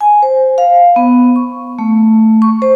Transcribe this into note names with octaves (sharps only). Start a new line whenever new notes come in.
G#5
C5
F5
B3
C#6
A3
C#6
C5